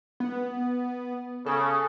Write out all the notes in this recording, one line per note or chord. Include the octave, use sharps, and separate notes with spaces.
B3
C#3 A4